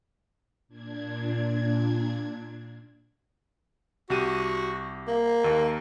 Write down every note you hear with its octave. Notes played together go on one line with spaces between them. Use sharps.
A#2 D4 G#6
C2 F#4 G4 D#7
A#3
D#2 A#4